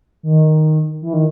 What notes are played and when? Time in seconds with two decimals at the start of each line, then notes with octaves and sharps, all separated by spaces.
0.23 D#3
1.02 E3
1.13 D#3